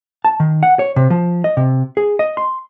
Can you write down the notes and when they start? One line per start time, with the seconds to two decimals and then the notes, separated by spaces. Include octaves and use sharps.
0.25 A5
0.40 D#3
0.63 F#5
0.79 C#5
0.96 C3
1.10 F3
1.44 D#5
1.57 C3
1.97 G#4
2.19 D#5
2.37 C6